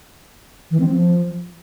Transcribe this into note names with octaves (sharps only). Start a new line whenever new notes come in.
E3
C4
F3